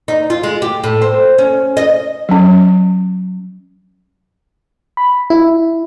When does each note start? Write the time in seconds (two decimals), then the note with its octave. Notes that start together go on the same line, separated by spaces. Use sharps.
0.08 D#4
0.30 F4
0.43 G#3
0.62 G4
0.84 A2
1.02 C4
1.38 C#4
1.77 D#5
2.29 F#3 C#4
4.97 B5
5.30 E4